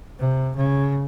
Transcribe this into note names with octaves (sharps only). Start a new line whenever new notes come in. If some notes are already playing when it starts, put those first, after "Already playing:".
C3
C#3